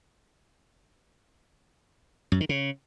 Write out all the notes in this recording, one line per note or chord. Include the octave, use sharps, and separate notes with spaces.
F#2
D#3
C#3